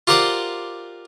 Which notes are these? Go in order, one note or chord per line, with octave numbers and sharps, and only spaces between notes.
F4 G4 A#4 C5 D5 F#5